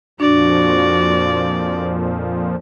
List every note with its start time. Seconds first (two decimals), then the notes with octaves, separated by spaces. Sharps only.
0.20 F2 A#2 F3 D4 F#4 D5